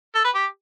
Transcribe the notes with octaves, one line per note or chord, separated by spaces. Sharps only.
A4
B4
G4